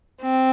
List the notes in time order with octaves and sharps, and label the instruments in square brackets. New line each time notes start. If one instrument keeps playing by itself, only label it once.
[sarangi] C4